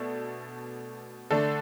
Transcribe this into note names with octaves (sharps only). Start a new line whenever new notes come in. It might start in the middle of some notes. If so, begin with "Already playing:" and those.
Already playing: B2 A3 D4 A4
D3 A3 D4 A4